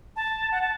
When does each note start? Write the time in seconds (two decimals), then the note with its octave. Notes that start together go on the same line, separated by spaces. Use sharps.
0.16 A5
0.52 F#5
0.61 A5